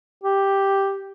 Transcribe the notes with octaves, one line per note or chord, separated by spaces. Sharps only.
G4